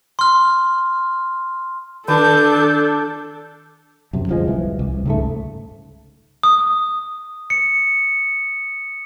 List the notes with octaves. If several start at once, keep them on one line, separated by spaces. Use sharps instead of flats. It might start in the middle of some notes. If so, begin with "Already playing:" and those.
C6 F6
D#3 D4 A4 G6
F#2 C3
D1 F3 G#3
C2 E3
C2
C#2 G#2 A3
D#6
C#7